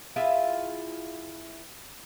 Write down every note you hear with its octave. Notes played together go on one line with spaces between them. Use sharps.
E4 F4 G#4 E5